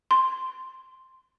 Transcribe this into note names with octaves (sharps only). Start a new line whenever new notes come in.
C6